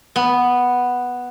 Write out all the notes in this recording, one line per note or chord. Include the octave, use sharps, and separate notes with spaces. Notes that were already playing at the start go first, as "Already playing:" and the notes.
B3